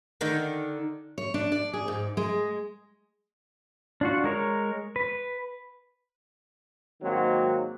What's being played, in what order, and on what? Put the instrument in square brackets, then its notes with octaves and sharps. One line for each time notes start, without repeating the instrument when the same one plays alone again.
[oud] D3 D#3 D#4
[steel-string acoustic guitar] C#5
D4
D5
G#4
G#2
G#3
[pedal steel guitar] D4 F4 F#4
G#3 A#4 C#5
B4
[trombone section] G#2 D#3 F#3 A#3 C4 F#4